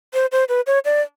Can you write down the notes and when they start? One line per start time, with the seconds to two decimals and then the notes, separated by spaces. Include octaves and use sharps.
0.14 C5
0.32 C5
0.49 B4
0.67 C#5
0.85 D5